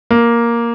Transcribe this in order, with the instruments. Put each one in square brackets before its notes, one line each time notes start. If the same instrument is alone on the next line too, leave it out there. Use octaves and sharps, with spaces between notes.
[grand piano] A#3